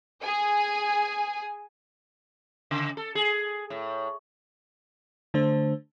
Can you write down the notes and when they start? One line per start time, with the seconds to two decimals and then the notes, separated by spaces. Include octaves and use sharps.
0.22 G#4 G#5
2.71 C#3
2.97 A4
3.15 G#4
3.70 A2
5.34 D3 A3 D4 C5